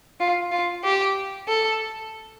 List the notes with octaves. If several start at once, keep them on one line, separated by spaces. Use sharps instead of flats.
F4
F4
G4
A4